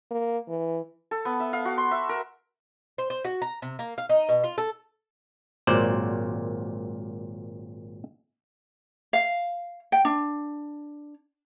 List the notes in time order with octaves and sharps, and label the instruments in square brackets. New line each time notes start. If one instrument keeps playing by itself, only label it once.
[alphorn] A#3
E3
[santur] A4
B3
E5
F5
F#4
C6
E5
A#4
[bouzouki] C5
C5
F#4
A#5
C3
A#3
F5
D#4
B2
F4
A4
[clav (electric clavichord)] G#1 A#2 F#3 C5 D5
[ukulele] F5
G5
D4